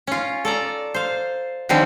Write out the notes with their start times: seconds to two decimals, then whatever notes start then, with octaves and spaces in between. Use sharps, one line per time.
0.07 C#4 F4
0.45 A4 D5 A#5
0.94 C5 F5
1.69 D3 D#3 F3 G3 C4 C#4